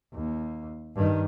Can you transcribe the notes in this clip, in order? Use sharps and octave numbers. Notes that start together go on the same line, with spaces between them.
D#2
G2 D#3